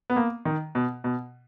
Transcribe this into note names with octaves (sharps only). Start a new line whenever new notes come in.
B3
A#3
D#3
B2
B2